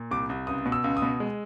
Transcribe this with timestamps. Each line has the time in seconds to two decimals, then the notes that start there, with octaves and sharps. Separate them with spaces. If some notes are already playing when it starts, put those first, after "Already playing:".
Already playing: A#2
0.11 C2 D6
0.29 C2
0.47 C#2 D#6
0.66 B2
0.72 E6
0.84 C#2
0.97 D#6
1.02 B2
1.20 G#3